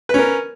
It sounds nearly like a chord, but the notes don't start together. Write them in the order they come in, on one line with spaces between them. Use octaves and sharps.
B4 C#4 A#4